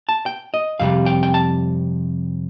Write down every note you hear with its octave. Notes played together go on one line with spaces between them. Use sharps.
A5
G5
D#5
F2 C3 G3 F5
G5
G5
A5